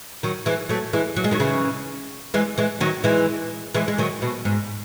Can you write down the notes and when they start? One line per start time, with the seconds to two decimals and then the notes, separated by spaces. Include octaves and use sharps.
0.23 D#3 F#3
0.46 E3 G#3
0.69 F#3 A3
0.93 E3 G#3
1.16 F#3
1.24 G#3
1.31 D#3 F#3
1.40 C#3 E3
2.34 E3 G#3
2.58 E3 G#3
2.81 D#3 F#3
3.04 E3 G#3
3.74 E3 G#3
3.88 G#3
3.98 D#3 F#3
4.22 B2
4.45 G#2